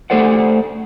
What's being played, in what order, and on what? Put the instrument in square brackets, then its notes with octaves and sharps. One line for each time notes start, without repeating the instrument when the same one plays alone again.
[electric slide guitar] A3 G4 A4 C5 D5 F#5